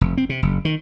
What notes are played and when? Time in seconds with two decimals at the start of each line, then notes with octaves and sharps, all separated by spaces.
0.01 F1
0.17 C4
0.29 C3
0.43 F#1
0.65 D#3